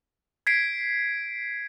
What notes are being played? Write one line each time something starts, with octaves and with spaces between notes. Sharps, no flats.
G#6 B6 C7 D7